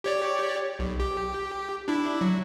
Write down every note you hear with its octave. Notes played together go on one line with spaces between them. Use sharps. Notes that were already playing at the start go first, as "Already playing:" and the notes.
G4 C#5 D5
B1
G4
D4 E4
F#3